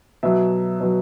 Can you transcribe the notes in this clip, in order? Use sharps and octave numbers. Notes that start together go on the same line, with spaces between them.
B2 F#3 E5
B2 F#3